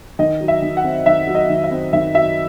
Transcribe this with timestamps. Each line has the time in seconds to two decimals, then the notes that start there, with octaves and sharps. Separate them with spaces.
0.19 D#3 D#5
0.41 F#3
0.48 E5
0.62 D#3
0.77 F#5
0.84 C4
1.06 D#3 E5
1.27 F#3
1.35 D#5
1.49 D#3
1.64 E5
1.71 C4
1.93 D#3 E5
2.15 F#3 E5